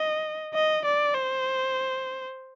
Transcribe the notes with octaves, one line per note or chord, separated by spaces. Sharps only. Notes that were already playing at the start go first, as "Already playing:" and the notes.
Already playing: D#5
D#5
D5
C5